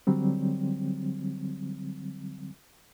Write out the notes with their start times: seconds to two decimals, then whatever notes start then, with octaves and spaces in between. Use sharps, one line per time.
0.07 D3 F#3 G3 C4